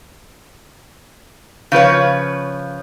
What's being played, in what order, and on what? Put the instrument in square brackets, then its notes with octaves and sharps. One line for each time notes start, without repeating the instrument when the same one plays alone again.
[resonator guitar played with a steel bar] C#3 F3 B4 C#5